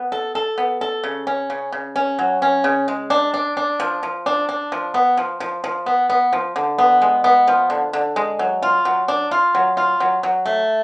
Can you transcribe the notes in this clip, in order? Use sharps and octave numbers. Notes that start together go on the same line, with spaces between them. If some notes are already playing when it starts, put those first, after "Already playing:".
Already playing: B3
A4
A4
B3
A4
C#3
C#4
C#3
C#3
C#4
F#3
C#4
C#3
G#3
D4
D4
D4
F3
F3
D4
D4
F3
B3
F3
F3
F3
B3
B3
F3
D3
B3
G#3
B3
F3
D3
D3
G#3
F#3
F4
F#3
D4
F4
F#3
F4
F#3
F#3
A3